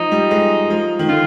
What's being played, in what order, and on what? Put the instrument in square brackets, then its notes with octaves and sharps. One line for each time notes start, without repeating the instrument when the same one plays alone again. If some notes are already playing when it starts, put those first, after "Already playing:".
Already playing: [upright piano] F3 [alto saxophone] D#4
[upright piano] G3
G#3
F3
D#3
[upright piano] D3 [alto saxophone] F4